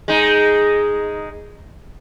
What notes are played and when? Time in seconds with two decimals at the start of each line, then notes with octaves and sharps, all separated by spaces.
0.08 G#3 D#4